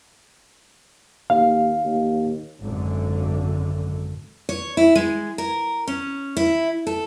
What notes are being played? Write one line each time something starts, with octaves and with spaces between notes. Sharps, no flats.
D#2 F5
D#2
G#1 F#2 D3
C#5
E4
G#3
A#4
C#4
E4
A4